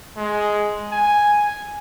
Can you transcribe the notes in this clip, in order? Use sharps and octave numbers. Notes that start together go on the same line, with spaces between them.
G#3
G#5